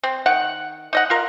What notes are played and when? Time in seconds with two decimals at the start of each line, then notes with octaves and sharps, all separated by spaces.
0.03 C4
0.26 D#3 F#5
0.93 D#4 D#5 F#5
1.10 F4 A#4